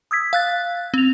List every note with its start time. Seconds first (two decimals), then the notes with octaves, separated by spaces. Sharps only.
0.11 D#6 E6 G#6 B6
0.33 F5 F#6 A6
0.94 C4 F7